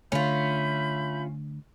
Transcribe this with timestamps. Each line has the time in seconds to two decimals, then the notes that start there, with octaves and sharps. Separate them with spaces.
0.12 D3 A3 C#4 F4 E5 B5 G6